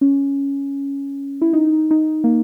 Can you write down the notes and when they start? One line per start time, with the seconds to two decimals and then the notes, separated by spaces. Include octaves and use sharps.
0.01 C#4
1.42 E4
1.53 D#4
1.91 D#4
2.24 A#3